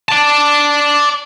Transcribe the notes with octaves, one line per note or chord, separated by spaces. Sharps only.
D5 A5